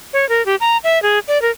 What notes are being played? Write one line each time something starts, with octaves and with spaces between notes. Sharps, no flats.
C#5
A#4
G4
A#5
E5
G#4
D5
A#4